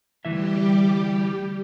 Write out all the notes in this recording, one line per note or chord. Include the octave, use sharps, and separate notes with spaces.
D2 E3 G3 G4 E5